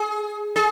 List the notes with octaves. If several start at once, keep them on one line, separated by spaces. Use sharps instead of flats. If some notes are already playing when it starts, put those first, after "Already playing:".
Already playing: G#4
G#4